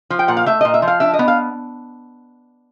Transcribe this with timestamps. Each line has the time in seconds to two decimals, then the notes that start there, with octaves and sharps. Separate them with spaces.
0.10 F3
0.19 G5
0.28 A#2 F#5
0.37 F5
0.46 A3 E5
0.61 A#2 D#5
0.74 E5
0.82 F3
0.88 F5
1.00 D4 E5
1.13 D#5
1.19 B3
1.28 F5